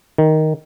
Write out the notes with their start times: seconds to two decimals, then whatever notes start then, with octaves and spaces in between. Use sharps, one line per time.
0.18 D#3